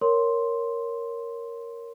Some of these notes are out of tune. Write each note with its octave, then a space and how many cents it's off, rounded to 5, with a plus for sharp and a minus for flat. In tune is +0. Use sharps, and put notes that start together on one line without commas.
A#4 +0 C#5 +0 C6 +0